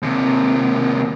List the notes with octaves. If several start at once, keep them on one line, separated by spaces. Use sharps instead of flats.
D#2 C3